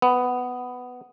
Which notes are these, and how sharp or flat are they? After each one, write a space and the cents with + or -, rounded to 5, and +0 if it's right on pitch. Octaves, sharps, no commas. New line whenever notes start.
B3 +10